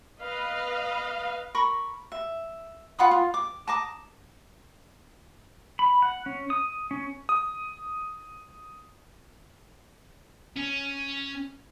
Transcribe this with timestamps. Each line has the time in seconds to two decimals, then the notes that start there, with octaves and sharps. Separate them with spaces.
0.21 B4 D#5 F5
1.55 A#4 B5 C#6
2.12 E5
2.99 F4 F#5 B5 D#6
3.11 F4
3.34 D6
3.68 A5 A#5 D6 D#6
5.79 B5
6.02 F#5
6.26 C#4
6.50 D#6
6.91 C#4
7.29 D#6
10.57 C#4